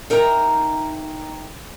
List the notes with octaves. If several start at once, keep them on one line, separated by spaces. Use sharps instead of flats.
D#4 A#4 E5 G5 A#5